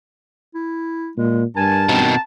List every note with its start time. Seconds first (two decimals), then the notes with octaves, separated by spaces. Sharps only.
0.55 E4
1.17 A#2 G#3
1.56 G2 A#4 G#5 A5
1.89 B2 D#3 C4